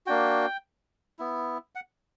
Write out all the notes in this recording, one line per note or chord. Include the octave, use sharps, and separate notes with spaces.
A#3 D4 F#4 G5
B3 E4
F#5